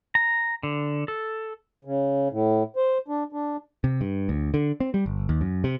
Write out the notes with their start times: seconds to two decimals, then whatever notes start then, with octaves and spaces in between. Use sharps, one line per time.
0.15 A#5
0.63 D3
1.08 A4
1.85 C#3
2.31 A2
2.76 C5
3.08 D4
3.33 D4
3.84 C3
4.01 G2
4.29 D2
4.54 D3
4.80 C4
4.94 G3
5.06 G1
5.29 D#2
5.41 F#2
5.64 C3